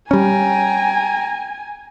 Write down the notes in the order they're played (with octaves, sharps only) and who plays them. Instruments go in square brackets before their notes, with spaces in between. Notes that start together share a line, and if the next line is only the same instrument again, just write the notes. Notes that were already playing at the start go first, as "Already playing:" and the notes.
[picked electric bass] G3 C#4 [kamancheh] G5 A#5 [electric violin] G#5